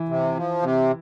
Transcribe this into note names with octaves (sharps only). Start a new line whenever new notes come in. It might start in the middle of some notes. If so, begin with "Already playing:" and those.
Already playing: E3
C3
F3
C3